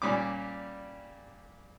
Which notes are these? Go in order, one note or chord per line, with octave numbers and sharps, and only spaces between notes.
A#2 G3 C#4 D6